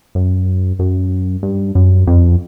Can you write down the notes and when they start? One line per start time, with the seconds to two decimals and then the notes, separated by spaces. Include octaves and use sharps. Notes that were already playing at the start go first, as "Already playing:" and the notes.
0.15 F#2
0.79 F#2
1.43 G2
1.75 F#2
2.07 F2